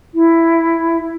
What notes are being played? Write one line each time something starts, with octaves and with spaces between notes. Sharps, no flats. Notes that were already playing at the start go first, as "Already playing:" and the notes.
E4